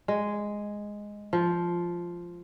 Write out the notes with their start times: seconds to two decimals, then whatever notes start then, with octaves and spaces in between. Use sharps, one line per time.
0.08 G#3
1.33 F3